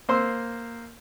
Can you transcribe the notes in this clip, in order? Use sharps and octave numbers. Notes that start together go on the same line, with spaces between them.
A#3 C5 C6 E6